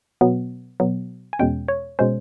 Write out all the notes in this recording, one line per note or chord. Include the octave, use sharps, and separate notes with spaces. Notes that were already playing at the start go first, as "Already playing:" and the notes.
B2 F#3 B3
B2 F#3 B3
G#5
E2 B2 G#3 C#4 G5
C#5
B2 G#3 C#4 C5